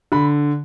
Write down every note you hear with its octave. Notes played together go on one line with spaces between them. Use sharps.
D3 B5